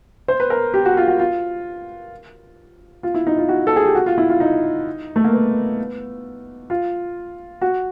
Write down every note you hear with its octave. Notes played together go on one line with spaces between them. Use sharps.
C5
B4
A#4
G4
F#4
F4
F#4
F4
F4
E4
D#4
F4
F#4
A4
G#4
G4
F#4
F4
E4
F4
D#4
A3
A#3
B3
F4
F#4